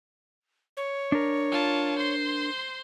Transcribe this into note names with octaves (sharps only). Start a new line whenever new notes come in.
C#5
D4 A#4
F4 A5
C5 C6